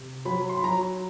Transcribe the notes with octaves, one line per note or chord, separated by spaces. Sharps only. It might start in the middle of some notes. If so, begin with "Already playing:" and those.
Already playing: C3
F#3 B5
C6
B5
F#3 A#5